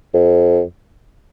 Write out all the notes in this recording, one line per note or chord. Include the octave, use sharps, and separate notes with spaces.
F2